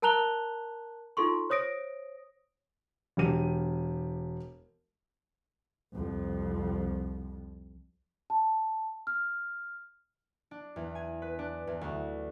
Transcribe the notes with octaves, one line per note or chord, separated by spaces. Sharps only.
A#4 A5 A#5 F#6 F7 G7
D#4 F4 A4 C6 C#6
C5 C#5 D#6 A#6 D7
E1 G4 D#7
C2 F2
A5
F6
D4
E2
G#5
B4
D4
E2
D2